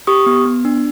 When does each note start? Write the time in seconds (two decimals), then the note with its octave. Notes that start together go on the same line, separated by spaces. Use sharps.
0.07 G4 C#6 D#6
0.26 B3
0.46 B3
0.65 D4